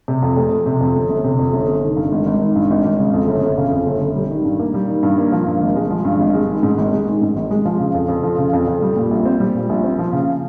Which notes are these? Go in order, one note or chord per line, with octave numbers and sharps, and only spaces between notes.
C3
F2
F1
F1
C3
F2
G1
G1
C3
F2
G1
G1
D#3
G2
G#1
G#1
D#3
G2
G#1
G#1
C#3
F2
G1
G1
C#3
F2
G1
G1
G3
D#3
G2
A#3
G3
D#3
G2
A#3
F3
G2
G#1
G#3
F3
G2
G#1
G#3
D#3
G#2
G#1
G#3
D#3
G#2
G#1
G#3
F3
C#3
F2
F2
F3
C#3
F2
F2
G3
A#2
A#1
C4
G3
A#2
A#1
C4
F3
C#3